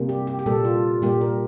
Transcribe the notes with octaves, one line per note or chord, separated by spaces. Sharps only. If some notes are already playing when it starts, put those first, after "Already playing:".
Already playing: C3 G3 A#3
G4
G4
G4
A#2 G3 A#3 A4
F4
A#2 G3 A#3 G4
A#4